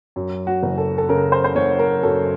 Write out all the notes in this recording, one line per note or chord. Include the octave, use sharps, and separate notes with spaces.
F#2
F#4
F#1
A4
A4
C#3 A#4
C5
C5
F#1 C#5
A#4
F#2 A4